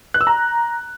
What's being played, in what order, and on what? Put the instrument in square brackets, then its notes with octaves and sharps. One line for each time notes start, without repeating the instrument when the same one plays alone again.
[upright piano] F#6
E6
A#5